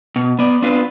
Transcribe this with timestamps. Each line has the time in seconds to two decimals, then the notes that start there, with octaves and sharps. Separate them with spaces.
0.16 B2
0.39 B3 D5
0.62 B3 C4 D4 F4 B4